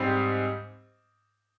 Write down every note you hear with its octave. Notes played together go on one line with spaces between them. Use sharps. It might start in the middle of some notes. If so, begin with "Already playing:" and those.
Already playing: G#2 G3 C4 G4